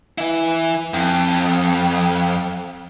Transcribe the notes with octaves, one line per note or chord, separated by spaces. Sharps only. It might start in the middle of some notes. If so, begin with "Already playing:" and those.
E3 E4
F2